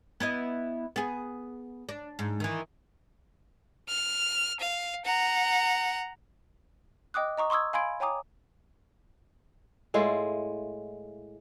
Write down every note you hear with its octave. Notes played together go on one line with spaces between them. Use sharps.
B3 E4 D#5
B3 G#4
D4
G#2
D#3 E3
F6
F5
F#5 A#5
D#5 G5 D6 D#6 F#6
D#5 A#5 C#6 D#6
C6 C#6 D#6 E6 G#6
F5 G#5 B5 C6 G#6 D7
C#5 G5 G#5 A#5 D6 D#6
A2 G#3 E4 F4